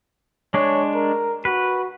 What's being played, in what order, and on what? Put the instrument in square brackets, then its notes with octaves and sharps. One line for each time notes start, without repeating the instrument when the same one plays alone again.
[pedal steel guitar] G#3 D4 [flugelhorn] C#5
[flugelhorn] A#4
[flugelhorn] F#4 [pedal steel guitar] B4